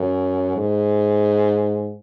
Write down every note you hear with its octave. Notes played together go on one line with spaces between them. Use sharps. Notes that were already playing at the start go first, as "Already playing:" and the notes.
Already playing: F#2
G#2